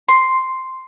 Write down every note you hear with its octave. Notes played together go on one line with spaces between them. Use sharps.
C6